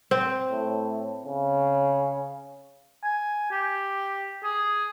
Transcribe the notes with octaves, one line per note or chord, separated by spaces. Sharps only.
C4
A2
C#3
G#5
G4
G#4